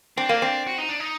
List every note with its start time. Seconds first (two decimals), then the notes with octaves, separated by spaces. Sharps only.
0.17 C4 D4
0.29 A#3
0.42 C4
0.67 F#4
0.78 D#4
0.89 D4
1.00 D#4